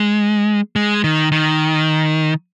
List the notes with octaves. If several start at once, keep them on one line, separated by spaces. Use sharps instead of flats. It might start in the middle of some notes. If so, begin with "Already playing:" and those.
Already playing: G#3
G#3
D#3
D#3